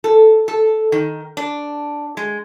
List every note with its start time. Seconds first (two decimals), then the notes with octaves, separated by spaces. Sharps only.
0.04 A4
0.48 A4
0.92 D#3
1.37 D4
2.17 G#3